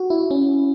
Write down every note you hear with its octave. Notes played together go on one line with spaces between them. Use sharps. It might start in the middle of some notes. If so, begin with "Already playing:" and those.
Already playing: F#4
E4
C#4